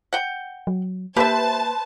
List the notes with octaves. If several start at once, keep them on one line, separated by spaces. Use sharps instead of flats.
F#5 G5
F#3
A#3 G4 B4 C5 E5 A5